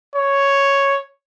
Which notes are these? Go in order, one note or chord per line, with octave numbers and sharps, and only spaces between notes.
C#5